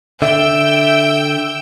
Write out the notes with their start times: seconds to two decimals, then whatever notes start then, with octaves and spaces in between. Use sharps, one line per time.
0.22 D3 E5 G5 E6